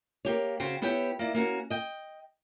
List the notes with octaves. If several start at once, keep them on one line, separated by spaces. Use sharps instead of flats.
A#3 G4 C#5
C#3 C4 F#4
B3 E4 G4 B4 C#5 G5
A#3 E4 D5
A#3 C#4 F#4
D#5 G5